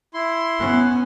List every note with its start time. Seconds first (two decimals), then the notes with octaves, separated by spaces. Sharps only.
0.14 E4 C6
0.59 B3 C#4